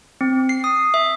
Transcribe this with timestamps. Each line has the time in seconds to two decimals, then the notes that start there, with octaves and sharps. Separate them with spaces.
0.21 C4
0.49 C7
0.64 D#6
0.94 E5